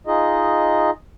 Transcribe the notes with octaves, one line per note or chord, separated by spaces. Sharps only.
D#4 F4 G#4 D#5